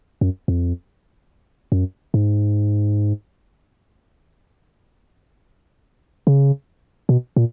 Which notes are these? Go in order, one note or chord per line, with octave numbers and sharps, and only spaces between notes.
F#2
F2
F#2
G#2
C#3
B2
A#2